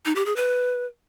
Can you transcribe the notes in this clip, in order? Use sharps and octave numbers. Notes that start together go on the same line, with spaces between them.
D#4
G4
G#4
B4